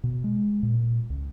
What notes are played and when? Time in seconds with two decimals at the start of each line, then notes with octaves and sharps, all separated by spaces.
0.04 B2
0.24 G#3
0.63 A#2
1.10 C#2